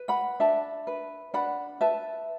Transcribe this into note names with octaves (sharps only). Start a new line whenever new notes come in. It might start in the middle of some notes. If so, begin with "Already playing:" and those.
Already playing: B4
F#5 B5
D4 E5 A5
B4
D4 F#5 B5
B4 E5 A5